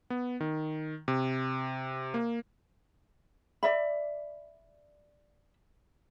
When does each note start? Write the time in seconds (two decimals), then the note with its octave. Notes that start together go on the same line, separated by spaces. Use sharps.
0.10 B3
0.40 D#3
1.08 C3
2.14 A#3
3.63 D5 E5 B5